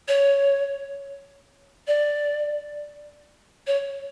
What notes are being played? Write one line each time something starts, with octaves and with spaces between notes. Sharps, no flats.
C#5
D5
C#5